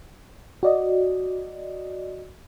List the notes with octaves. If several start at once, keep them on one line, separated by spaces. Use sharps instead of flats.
F#4 D5 D#5